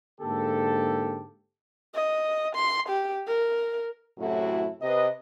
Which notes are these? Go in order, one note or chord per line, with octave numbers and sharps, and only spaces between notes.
G#2 D3 A#3 G4 A4
D#5
C6
G4
A#4
F#2 A2 C3 E4 F#4 A4
C3 B4 D#5